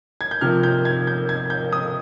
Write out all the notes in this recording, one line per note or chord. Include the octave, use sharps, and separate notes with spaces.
G#6
G6
C3 F3 A#3 F6
G6
G#6
G6
G#6
G6
D#6